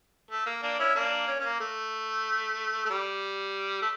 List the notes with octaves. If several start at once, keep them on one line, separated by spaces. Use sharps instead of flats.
A3
A#3
A#3 D4
C#4 E4
A#3 D4
C#4
C#4
A#3
A3
A3
G3
A3